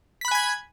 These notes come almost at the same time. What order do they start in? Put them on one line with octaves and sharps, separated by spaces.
B6 B5 F#6 G#5 G#6